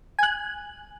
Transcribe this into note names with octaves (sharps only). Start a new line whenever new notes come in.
G#5 F#6